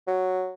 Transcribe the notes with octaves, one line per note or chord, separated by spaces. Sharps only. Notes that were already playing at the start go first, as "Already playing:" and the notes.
F#3